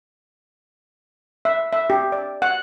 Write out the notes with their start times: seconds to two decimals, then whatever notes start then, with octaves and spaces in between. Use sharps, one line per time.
1.45 E5
1.73 E5
1.90 G4
2.12 D5
2.42 F#5